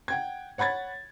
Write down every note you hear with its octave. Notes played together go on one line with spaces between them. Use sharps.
F#5 G5 G#6
C#5 F#5 B5 G#6 A6